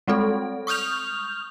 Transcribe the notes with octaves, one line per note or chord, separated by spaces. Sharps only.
G3 G#3 C4 A4
C#6 D#6 F6 G6 F7